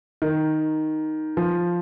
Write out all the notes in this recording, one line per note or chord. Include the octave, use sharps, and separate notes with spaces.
D#3
F3